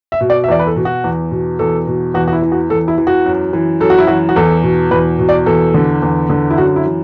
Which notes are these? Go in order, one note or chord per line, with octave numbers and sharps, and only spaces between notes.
E5
B2
D5
E5
E2 D5
B4
A4
B2
F#4
E2
B2
E2 A4
B2
E2 F#4
F#4
E4
E3
F#4
E2 A4
E4
E3
F#4
F#2
E3
F#2 A4
F#4
E4
E3 F#4
F#4
E2 A4
B2
E2 B4
B2
D5
E2 A4
D3
E2
D3
E4
F#2 F#4
E4
E3